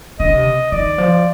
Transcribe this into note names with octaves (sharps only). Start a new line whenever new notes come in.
D3 D#5
C3
D#3 D5
F3